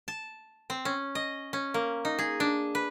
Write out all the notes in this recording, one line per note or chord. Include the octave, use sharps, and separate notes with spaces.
A5
C4
C#4
D#5
C#4
A#3
D#4
G#4
D4
B4